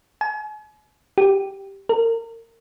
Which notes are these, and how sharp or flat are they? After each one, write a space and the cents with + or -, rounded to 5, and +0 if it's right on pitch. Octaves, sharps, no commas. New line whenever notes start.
G#5 +40
G4 -5
A#4 -35